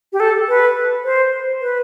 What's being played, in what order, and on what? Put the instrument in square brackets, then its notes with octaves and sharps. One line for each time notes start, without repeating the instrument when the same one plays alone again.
[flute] G4
A4
B4
C5
B4